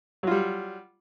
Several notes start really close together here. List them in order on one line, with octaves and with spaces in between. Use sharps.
F#3 F4 G3